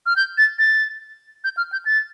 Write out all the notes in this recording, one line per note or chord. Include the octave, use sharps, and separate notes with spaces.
F6
G6
A6
A6
G6
F6
G6
A6